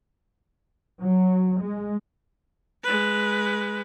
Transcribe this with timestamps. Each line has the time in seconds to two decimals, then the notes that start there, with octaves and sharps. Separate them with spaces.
1.02 F#3
1.62 G#3
2.83 G#3 B4